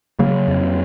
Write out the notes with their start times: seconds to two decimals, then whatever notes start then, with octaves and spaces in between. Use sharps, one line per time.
0.19 C#3 F#3 A#3
0.48 F2